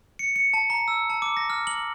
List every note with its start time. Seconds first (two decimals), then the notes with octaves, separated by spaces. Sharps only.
0.19 C#7
0.36 C#7
0.54 A5
0.70 A#5
0.88 E6
1.10 A5
1.22 D6
1.37 A#6
1.50 F6
1.67 F#7